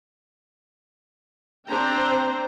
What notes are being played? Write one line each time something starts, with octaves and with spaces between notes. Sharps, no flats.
C4 D4 C5 G5 A#5